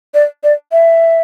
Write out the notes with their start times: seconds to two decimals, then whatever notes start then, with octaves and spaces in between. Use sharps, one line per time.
0.14 D5
0.44 D5
0.72 E5